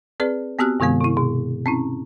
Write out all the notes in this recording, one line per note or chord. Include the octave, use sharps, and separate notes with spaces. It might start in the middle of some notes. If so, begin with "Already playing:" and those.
C4 G#4 B4 D5
B3 C4 F#4 G4 F6 F#6
G2 C3 D#3 G#3 B3
C3 E4
B2
C4 C#4 E4